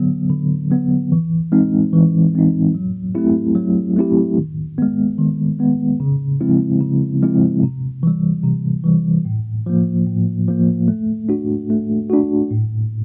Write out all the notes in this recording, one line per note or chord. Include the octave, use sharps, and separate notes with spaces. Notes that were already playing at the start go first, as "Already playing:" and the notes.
Already playing: D3 F#3 B3
D3
F#3 B3
E3
G#3 C4 D#4
E3
G#3 C4 D#4
F#3
A3 C4 E4 G4
F#3
A3 C4 E4 G4
D#3
G#3 B3
D#3
G#3 B3
C#3
F3 G#3 C4 E4
C#3
F3 G#3 C4 E4
C3
E3 G3
C3
E3 G3
A2
F3 A#3
A2
F3 A#3
A3
D4 F#4
A3
D4 F#4
A2